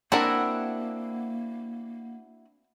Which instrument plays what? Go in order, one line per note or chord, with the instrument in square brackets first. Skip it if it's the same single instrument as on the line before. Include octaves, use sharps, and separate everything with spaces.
[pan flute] A#3 [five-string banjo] C4 A#4 [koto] D4 F#5 [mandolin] E4 F#4